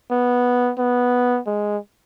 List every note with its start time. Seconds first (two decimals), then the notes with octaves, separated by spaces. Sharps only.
0.11 B3
0.78 B3
1.47 G#3